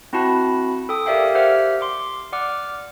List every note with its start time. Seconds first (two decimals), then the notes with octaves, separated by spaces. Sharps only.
0.13 C4 E4 F#4 F#5 A5 B5
0.89 A4 G5 D#6
1.06 G4 A#4 D5 E5 F5 G5
1.35 G4 C5 E5 F#5 F6
1.81 C6 D6
2.33 D5 F#5 D6 F6